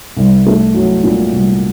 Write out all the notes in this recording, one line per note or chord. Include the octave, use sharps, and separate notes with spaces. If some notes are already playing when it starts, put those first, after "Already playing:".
C2
A3
F#3
A#2
C2